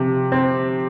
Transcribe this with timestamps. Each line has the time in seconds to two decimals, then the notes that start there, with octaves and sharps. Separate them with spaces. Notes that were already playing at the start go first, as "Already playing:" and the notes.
Already playing: C3 F3
0.32 C4